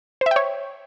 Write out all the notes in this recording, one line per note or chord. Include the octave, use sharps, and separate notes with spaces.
C5 C#5 E5 G5